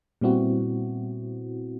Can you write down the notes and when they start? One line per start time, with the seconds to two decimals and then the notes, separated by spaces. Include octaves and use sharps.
0.21 A#2 G3 B3 C4 E4 F#4